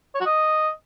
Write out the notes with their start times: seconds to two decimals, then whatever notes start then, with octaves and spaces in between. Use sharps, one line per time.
0.15 C#5
0.20 F#4
0.26 D#5